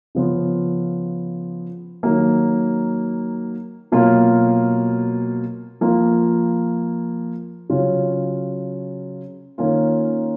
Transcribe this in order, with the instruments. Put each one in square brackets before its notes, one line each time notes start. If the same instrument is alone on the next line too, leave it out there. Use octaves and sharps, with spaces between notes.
[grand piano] C#3 F3 B3 F4
D#3 F#3 A#3
B2 F#3 A#3 F4
F3 A#3 F4
C#3 F#3 C#4 F4
D#3 A#3 C#4 F4